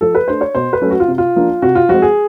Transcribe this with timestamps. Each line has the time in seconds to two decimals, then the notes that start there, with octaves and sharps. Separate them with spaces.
0.01 F3 A4
0.15 B4
0.28 A3 D4 C5
0.41 C#5
0.55 B2 C5
0.73 B4
0.82 F#3 A3 C#4
0.90 F#4
1.00 F4
1.08 C3
1.18 F4
1.36 F3 A#3 D4
1.62 C3 F#4
1.75 F4
1.89 F3 G#3 C4 F#4
2.02 G#4